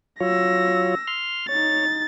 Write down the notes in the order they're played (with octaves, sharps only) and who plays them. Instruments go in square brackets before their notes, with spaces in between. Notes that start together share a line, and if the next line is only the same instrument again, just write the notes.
[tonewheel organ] F#3 F4 C#5 [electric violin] E6 A#6
[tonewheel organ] C6 F6
[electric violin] D#4 A6 [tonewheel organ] C#5